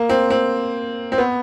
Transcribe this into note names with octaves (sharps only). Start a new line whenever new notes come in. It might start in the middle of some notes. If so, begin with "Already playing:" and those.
Already playing: A#3
C4
C4
C4
B3